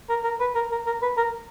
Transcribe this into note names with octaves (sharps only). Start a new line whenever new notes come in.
A#4
A#4
B4
A#4
A#4
A#4
B4
A#4